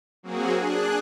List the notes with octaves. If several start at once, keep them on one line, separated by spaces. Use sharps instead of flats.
F#3 A#3 C4 F#4 G#4
D4 G#4 F#6